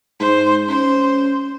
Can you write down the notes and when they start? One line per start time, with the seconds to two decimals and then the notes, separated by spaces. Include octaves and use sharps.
0.20 G#2 C5
0.69 C#4 C5